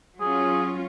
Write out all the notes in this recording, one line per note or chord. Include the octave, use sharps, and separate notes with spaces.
F#3 C#4 F4 G#4